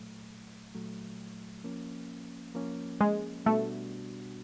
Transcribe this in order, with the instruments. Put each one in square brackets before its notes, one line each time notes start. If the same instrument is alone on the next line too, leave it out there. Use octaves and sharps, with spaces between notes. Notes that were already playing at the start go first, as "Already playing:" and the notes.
Already playing: [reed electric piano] A#2 F#3 A3
A#2 F#3 A3
F3 A#3 C#4
F3 A#3 C#4
[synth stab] G#3
[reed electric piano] B2 G3 B3 D4 F#4 [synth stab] A3